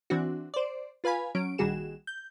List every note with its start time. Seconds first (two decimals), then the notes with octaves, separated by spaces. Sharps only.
0.10 E3 C4 D4 F#4
0.54 C5 D5
1.04 F4 B4 F5 G#5 B5
1.35 F#3 C#4 D7
1.58 A#1 D#3 G3 F#4 G#4 E7
2.07 G6